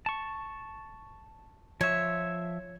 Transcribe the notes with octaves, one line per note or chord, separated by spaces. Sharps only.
A5 C#6
F3 C#5 E5